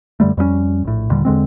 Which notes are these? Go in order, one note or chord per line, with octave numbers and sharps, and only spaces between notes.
F#2 D3 G3 A3
F2 G3 A3 C#4
A#1 A2
D#2 A#2 D3 G3
E2 D3 G#3 C4